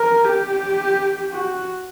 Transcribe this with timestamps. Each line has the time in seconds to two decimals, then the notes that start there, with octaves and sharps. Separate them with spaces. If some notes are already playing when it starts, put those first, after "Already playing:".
Already playing: A#4
0.24 G4
1.32 F#4